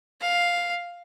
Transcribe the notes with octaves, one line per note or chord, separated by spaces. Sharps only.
F5